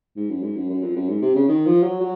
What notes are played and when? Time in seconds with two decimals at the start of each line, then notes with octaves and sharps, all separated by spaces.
0.16 G#2
0.30 F#2
0.43 G#2
0.56 F#2
0.70 F#2
0.82 F2
0.96 F#2
1.09 G#2
1.22 C3
1.35 C#3
1.49 D#3
1.67 F3
1.83 F#3
2.00 F#3